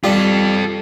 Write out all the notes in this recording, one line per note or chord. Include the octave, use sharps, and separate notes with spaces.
G3 F4 A4